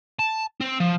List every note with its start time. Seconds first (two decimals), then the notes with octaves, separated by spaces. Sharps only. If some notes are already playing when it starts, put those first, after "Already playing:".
0.19 A5
0.61 C4
0.80 F3